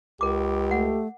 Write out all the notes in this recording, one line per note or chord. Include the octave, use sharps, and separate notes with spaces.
C#2 G4 A#4 D6
A3 F#5